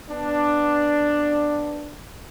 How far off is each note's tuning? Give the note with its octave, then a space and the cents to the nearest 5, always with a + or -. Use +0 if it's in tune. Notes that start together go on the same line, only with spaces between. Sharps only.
B3 +0 D4 +5